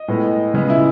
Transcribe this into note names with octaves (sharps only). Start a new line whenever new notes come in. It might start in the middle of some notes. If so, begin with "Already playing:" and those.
Already playing: D#5
A2 G#3 B3
C#3 G#3 B3
E4